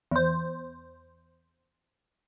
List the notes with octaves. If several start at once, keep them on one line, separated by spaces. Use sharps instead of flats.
E2 C5